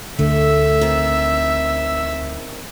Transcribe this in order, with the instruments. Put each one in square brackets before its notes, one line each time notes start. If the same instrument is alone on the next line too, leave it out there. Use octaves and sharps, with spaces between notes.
[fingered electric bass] D2 D3 [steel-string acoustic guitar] A3 [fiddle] E5 E6
[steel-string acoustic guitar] D#3 C4